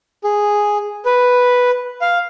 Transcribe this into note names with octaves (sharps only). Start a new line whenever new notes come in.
G#4
B4
F5